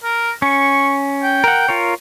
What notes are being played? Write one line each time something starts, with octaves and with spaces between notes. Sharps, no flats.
A#4
C#4 C#6
G5
A#4 F#5
F4 A#4 C#5